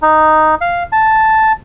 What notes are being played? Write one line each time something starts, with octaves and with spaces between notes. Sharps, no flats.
D#4
F5
A5